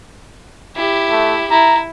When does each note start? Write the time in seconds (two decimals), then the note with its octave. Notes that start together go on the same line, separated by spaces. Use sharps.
0.76 E4 G4
1.10 A3
1.51 E4 A#5